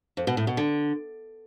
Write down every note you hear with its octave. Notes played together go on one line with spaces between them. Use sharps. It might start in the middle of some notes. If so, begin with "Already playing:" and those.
F2
B2
A2
B2
D3